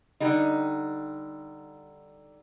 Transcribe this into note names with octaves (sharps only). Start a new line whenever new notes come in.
D3 G3 D#4